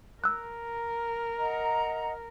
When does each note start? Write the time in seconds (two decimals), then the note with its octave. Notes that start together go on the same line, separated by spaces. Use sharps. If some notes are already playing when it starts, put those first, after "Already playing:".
0.24 A#4 E6 F#6
1.38 D#5 F#5 A#5